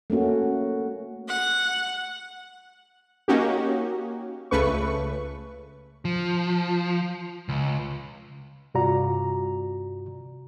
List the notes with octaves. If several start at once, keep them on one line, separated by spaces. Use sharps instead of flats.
A3 A#3 C#4 F#4
F#5
A#3 C#4 D#4 F#4 G4
C#2 C#3 A3 B4 C#6
F3
C#2
G2 C3 F4 F#4 D5 A#5